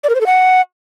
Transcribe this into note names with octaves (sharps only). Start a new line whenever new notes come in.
D5
A#4
C5
A4
F#5